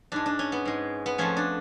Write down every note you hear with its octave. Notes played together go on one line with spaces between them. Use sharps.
G#2 G#3 D4
D4
C#4
B3
G#2 G#3
B3
F2 F3 A3 C#4
D4